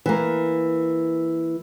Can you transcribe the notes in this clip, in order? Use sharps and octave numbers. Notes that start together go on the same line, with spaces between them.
E3 A#3